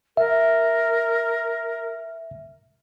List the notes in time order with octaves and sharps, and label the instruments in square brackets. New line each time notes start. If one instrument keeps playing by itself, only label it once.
[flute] A#4 [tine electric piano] E5